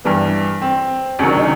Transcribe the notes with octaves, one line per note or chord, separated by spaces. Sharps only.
G2 E3 G3 B3
C4
C#2 C3 D#3 F#3 C#4
D4
D#4